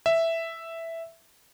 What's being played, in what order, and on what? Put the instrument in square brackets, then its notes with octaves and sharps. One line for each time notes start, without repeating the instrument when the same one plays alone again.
[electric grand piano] E5